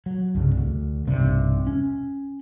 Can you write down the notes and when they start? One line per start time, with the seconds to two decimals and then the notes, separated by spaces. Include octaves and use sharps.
0.06 F#3
0.35 C2 G2 C#3
0.55 D2
1.07 B1 E2 G2 C3
1.67 C#4